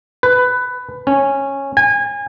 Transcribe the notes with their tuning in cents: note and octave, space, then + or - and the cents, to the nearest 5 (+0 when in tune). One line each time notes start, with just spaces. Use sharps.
B4 +15
C#4 -10
G#5 -30